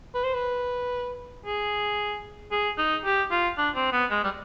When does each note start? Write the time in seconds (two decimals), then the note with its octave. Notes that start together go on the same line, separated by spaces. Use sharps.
0.14 B4
0.24 C5
0.34 B4
1.46 G#4
2.51 G#4
2.78 D#4
3.05 G4
3.31 F4
3.58 D4
3.75 C4
3.92 B3
4.10 G#3
4.24 G3